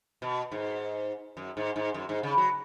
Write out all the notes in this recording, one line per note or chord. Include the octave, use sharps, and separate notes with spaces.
B2
G#2
F#2
G#2
G#2
F#2
G#2
C#3
F#3